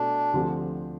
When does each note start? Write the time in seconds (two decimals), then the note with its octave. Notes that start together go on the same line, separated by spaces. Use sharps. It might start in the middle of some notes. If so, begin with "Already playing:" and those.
Already playing: B2 A3 D4
0.33 D2 D3 F3 C4 G4